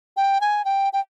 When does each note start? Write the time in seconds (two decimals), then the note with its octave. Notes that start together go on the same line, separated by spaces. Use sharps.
0.17 G5
0.41 G#5
0.65 G5
0.93 G5